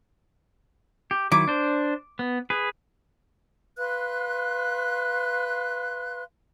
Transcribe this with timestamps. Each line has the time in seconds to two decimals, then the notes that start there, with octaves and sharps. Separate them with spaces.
1.11 G4
1.32 D#3 F#3 E4 D6
1.48 D4 C5
2.19 B3
2.50 G#4 B4
3.78 B4 F5 C6 F#6